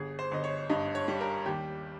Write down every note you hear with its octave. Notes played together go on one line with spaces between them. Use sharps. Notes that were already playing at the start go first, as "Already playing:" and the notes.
Already playing: G1 G#4
C5
G1 D#5
C#5
G2 D#5
C#5
G3
A#4
D#2 G4